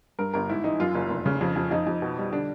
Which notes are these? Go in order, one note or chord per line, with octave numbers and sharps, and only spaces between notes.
G2 A#4
G1 A#4
G#2 E4
E3 D#4
F#2 F4
F#1
F1
C#3
F2
F2
F2 D#4
F2
B2
G3
D3 D4